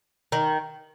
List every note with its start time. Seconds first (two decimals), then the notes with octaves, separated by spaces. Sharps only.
0.32 D#3